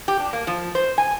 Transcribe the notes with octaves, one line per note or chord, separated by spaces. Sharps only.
G4
D4
A#3
F3
C5
G#5